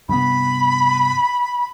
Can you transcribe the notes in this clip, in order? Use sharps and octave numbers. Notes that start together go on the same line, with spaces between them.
G2 C3 B3 B5